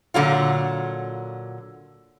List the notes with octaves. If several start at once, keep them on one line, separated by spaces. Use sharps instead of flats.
A#2 D3 F#3 F4